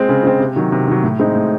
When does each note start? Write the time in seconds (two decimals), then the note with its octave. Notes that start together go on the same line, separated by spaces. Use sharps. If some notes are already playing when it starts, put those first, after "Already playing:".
Already playing: G#3 C4
0.09 C#3
0.24 G#3 C4
0.40 C3
0.56 D#3 F#3
0.72 C3
0.88 D#3 F#3
1.03 A2
1.20 G#3 C4 D#4
1.35 A2